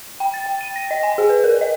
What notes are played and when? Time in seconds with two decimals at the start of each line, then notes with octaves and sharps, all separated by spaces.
0.20 G5
0.34 A6
0.46 G5
0.61 D#7
0.76 A#6
0.91 D#5
1.03 G#5
1.18 G#4
1.29 B4
1.44 A#4
1.61 D#5